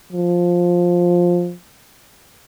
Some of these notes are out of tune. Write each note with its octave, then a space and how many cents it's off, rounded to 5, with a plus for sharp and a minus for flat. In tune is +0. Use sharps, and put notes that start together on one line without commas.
F3 +10